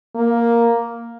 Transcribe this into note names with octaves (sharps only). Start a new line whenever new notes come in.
A#3